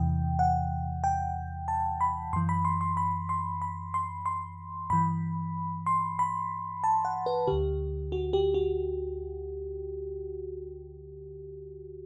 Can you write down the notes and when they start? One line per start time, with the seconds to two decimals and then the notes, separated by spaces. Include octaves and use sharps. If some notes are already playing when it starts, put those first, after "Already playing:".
Already playing: E2 C3 E3 G5
0.39 F#5
1.04 G5
1.68 A5
2.01 B5
2.33 F#2 E3 C6
2.49 B5
2.65 C6
2.81 C6
2.97 B5
3.29 C6
3.62 B5
3.94 C6
4.26 C6
4.90 G2 E3 B5
5.86 C6
6.19 B5
6.84 A5
7.05 F#5
7.26 B4
7.47 D2 D3 G4
8.12 F#4
8.33 G4
8.54 F#4